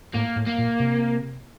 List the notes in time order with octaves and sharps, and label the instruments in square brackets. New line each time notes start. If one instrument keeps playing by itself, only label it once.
[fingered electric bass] A2 [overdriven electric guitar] A#3
[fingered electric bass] A2
[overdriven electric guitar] A#3
[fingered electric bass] A#2
C3